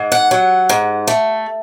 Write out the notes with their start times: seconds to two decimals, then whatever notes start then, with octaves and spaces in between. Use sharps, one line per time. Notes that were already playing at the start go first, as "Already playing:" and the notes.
Already playing: G#2
0.12 F#5
0.31 F#3
0.69 G#2
1.07 A3